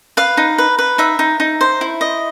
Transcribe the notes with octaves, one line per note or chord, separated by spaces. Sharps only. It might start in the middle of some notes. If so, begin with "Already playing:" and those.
B4 F5
D#4
B4
B4
D#4 E5
D#4
D#4
C5
E4
D#5